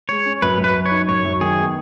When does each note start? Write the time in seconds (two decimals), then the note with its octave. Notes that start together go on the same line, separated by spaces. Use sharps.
0.09 G#3 C#5
0.26 C#4
0.42 F#2 B4
0.58 F#2
0.64 B4
0.75 F#3
0.86 C#5
0.91 D#4
1.09 F#2 C#5
1.25 F#2
1.41 D#3 G#4
1.58 B3